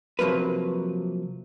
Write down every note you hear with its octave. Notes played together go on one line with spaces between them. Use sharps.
C3 F3 F#3 A#3 B4